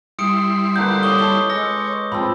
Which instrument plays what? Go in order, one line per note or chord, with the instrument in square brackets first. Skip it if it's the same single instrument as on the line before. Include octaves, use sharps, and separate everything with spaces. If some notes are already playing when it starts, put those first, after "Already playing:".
[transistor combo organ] G3 E4 C6 [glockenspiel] D#6 C#7 D7
[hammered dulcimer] D3 A#3 B4 [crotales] G6
[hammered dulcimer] C#5 D#5 B5 [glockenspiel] D6 D#6 G7
[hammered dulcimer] A5 [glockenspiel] G7
[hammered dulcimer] G#3 [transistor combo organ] C#5 [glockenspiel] E6 A#6
[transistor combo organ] G#2 [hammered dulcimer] F3 C4 [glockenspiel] B5 E6